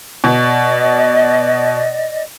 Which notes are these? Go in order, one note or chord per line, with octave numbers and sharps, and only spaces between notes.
B2 D5 D#5